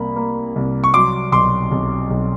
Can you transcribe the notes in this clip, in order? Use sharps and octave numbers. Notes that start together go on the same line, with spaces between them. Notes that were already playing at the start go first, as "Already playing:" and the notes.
Already playing: C2 A#3 B5
A#3
C2
C#6
F#3 C6 D6
B1 C6 D6
B1
B1